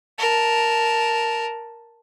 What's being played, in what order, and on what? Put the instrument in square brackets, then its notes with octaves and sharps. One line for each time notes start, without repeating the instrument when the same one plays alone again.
[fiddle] A#4 A5